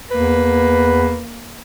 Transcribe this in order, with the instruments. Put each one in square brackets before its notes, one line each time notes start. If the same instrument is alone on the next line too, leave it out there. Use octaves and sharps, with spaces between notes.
[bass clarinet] E2 [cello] A#3 [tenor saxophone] B4